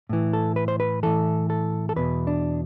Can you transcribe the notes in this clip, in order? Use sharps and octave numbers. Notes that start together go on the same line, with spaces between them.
A2 E3
A4
B4
C5
B4
A2 E3 A4
A4
A4
E2 B2 B4
D4